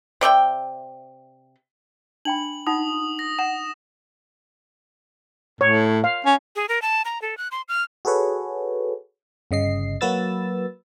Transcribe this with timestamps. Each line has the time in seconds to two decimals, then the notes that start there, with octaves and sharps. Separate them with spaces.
0.21 C3 D5 E5 G5
2.25 D4 G5 B5 F#7
2.67 D#4 F4 F#5 D#6
3.19 A#6
3.39 F#5 E7
5.61 A2 C#5
6.04 F5
6.26 C#4
6.56 G#4
6.69 A#4
6.82 A5
7.05 A#5
7.22 A4
7.38 F#6
7.51 C6
7.68 F6
8.05 F#4 G#4 A4 B4 C#5
9.51 G1 C#3 D#5 C7
10.01 F#3 A#3 F#4 B4 E6 A6